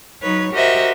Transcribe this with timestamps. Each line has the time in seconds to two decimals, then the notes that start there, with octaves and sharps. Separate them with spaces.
0.22 F#3 D#4 B4 C#5
0.53 F#4 G4 A#4 C5 D#5 E5